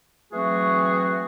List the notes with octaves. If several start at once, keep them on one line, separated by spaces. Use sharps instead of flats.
E3 F#3 A3 C4 F#4 G#4